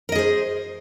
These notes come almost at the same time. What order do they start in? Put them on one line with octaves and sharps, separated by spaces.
A#4 D#5 G#4 C5